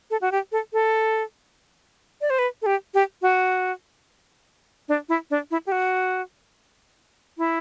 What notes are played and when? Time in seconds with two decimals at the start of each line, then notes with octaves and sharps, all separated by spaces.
0.10 A4
0.21 F#4
0.32 G4
0.52 A4
0.73 A4
2.21 D5
2.30 C5
2.39 B4
2.62 A4
2.66 G4
2.94 G4
3.22 F#4
4.88 D4
5.09 E4
5.30 D4
5.51 E4
5.67 G4
5.72 F#4
7.38 E4